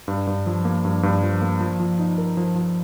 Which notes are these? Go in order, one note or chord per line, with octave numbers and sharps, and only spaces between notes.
G2
G2
F3
A#3
G2
G2
F3
A#3
F3
F3
D#4
A#4
F3
F3